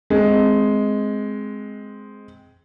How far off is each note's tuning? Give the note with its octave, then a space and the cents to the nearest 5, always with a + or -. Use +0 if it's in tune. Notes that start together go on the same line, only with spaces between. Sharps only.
G#3 +5 C4 -5